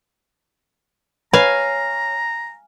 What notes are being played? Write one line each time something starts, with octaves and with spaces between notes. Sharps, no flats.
B4 C#5 F5 G#5 A#5